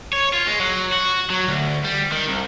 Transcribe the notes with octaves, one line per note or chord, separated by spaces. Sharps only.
C#5
F4
G#3
F#3
F#4
F#3
D2
G3
D#3
C2